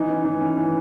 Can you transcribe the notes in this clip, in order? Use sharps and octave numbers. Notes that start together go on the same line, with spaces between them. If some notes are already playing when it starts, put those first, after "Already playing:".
Already playing: E3 D#4
C#4
E3
C#4
E3